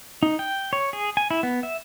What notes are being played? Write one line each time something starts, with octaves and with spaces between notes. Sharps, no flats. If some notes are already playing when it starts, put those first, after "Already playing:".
D#4
G5
C#5
G#4
G#5
E4
B3
E5